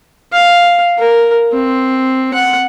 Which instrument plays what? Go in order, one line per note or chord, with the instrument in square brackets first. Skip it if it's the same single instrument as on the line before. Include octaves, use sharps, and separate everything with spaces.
[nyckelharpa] F5
A#4
C4
F#5